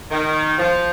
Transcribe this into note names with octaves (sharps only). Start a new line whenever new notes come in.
D#3
F3